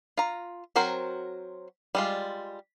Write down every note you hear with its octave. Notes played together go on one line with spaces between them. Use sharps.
F4 A#5
F#3 C4 F#4 A#4 C5
G3 G#3 F4